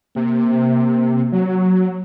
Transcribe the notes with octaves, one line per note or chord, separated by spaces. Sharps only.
C3 A#3
F#3